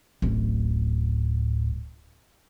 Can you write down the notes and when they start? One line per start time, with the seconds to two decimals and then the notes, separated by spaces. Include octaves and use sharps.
0.22 D1 A1